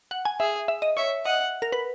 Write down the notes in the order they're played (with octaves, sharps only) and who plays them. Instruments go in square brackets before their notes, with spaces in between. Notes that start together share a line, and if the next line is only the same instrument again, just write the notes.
[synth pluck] F#5
G#5
[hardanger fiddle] G#4 [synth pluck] E5
[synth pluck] E5
D#5
[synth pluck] C#5 [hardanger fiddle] E5
[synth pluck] D#5 [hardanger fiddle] F#5
[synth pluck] A#4
B4